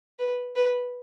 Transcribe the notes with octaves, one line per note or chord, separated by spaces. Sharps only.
B4
B4